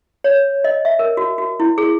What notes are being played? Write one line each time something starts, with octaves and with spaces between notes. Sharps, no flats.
C#5
D#5
E5
A#4
F#4
F#4
E4
G#4